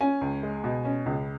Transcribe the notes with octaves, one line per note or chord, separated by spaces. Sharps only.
C#4 G#5
C#2
G#3
B2
C#4
C#2